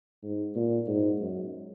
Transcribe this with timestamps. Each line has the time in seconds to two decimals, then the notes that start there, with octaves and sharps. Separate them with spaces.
0.23 G#2
0.56 A#2
0.88 G#2
1.20 F#2